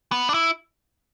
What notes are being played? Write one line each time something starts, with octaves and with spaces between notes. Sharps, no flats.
B3
D4
E4